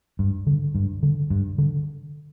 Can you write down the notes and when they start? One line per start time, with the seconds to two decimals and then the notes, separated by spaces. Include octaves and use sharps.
0.19 G2
0.47 D3
0.75 G2
1.03 D3
1.30 G2
1.58 D3